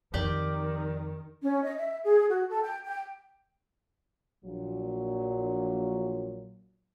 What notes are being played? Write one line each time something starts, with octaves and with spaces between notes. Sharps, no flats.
F2 D#3 G4 D5 G5
C#4
D#5
E5
G#4
F#4
A4
G5
G5
A#1 A#2 F#3